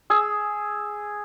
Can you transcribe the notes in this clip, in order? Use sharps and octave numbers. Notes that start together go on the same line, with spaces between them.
G#4 E6